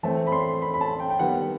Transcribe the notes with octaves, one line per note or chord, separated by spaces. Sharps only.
E3 A3 C4 A5
B5
C6
B5
B5
A5
G5
G5
D#3 G3 B3 F#5